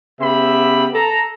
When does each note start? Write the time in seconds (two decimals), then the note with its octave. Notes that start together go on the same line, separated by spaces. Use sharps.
0.20 C#3 B3 G4 E5 B5
0.94 A4 A#5